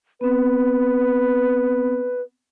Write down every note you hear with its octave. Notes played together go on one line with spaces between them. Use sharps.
B3 C4 B4